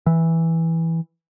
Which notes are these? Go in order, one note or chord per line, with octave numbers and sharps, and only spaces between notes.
E3